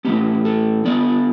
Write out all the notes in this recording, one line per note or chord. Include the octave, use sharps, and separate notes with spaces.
A2 E3 B3 G4
A4
D3 B3 D5